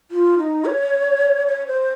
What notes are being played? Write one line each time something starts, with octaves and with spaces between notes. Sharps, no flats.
F4
D#4
C#5
C#5
C5